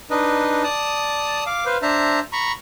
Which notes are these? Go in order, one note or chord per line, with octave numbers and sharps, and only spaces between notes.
D4 D#4 B4 D#5
D5 A5 D#6
F5 D6
B4 C5 F5
D4 C5 E5 A5 A#5
A#5 B5 C#6